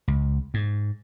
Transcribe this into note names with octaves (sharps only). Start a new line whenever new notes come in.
C#2
G#2